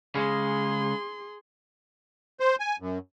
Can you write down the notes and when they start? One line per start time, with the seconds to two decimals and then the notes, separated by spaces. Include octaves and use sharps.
0.15 C#3 G#3 G#4 C6
2.40 C5
2.59 G#5
2.80 F#2